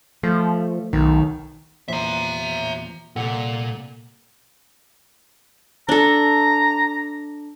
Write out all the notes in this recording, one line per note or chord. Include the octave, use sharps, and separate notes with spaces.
F3 A3
B1 D#3
E2 A#2 C5 E5 A#5
C2 A#2 A4 F#5
D4 A4 A#5